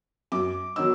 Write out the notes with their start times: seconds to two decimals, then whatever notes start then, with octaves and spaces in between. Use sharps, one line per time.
0.32 F#2 D6
0.76 D#3 F#3 B3 D#4 E6